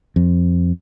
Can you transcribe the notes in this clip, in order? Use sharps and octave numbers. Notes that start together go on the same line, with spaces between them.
F2